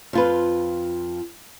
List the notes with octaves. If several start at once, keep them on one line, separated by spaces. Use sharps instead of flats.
F2 F4 B4